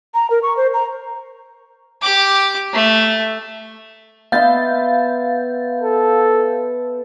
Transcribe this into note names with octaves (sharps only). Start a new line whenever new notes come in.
A#5
A#4
C#6
C5
A#5
G4 D6
A3
B3 E5 F5 C6 G6 A6
A4